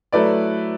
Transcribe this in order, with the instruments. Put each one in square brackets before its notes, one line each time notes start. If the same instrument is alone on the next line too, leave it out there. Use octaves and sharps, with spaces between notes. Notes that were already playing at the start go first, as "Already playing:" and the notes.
[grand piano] F#3 A3 E4 B4 D5